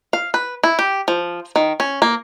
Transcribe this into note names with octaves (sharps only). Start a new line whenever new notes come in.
F5
B4
E4
G4
F3
D#3
C#4
A#3